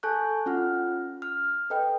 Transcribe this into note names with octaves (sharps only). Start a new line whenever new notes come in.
A4 G#5 A5 C#6 F#6 G6
C#4 F4 F#5 F6
F6
A4 B4 D#5 G5